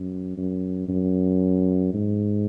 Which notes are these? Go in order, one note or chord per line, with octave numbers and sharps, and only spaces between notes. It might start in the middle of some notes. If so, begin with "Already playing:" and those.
Already playing: F#2
F#2
F#2
G#2